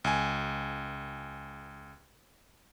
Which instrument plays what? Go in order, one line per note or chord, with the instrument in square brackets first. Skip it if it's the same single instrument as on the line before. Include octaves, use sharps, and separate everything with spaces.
[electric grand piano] C#2 G#5